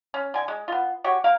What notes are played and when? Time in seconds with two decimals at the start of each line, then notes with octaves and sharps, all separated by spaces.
0.14 C#4
0.34 D3 G#5
0.48 G#3
0.68 B3 F4
1.04 F#4 G4 C#5
1.24 A#3 A#4 F5